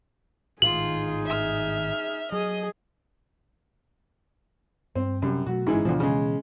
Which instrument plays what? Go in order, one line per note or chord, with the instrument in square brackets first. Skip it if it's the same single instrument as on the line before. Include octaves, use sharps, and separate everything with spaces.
[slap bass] G#1 A2 D#3 [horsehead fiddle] D#4 G#4 [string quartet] F4 [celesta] F#7
[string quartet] E5 F6
[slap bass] F#3 [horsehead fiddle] G#4 [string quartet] D#5
[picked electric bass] G2 [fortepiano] C4
[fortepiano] F#2 G3 [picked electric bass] C3
[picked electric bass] B2 F#3 A3 [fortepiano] F#4
[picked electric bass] G1 C#4 [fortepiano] G#2 E3 G#3
[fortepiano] D2 F3 [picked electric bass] B2 E3
[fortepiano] C#3 G#3